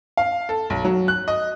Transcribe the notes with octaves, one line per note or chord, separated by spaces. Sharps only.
F5
A4
B1
F#3
F#6
D#5